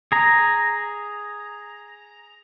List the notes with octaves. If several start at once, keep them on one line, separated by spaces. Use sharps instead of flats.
G#4 A#5